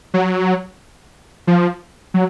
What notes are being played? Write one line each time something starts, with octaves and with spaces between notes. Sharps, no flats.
F#3
F3
F#3